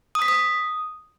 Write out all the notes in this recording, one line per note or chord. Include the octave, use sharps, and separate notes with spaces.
D#6
B6
D#6